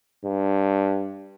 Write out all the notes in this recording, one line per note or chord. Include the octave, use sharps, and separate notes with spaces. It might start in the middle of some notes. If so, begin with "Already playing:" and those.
G2